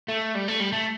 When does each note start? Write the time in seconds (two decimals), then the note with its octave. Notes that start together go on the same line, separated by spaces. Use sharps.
0.08 A3
0.35 G3
0.48 A3
0.60 G3
0.72 A3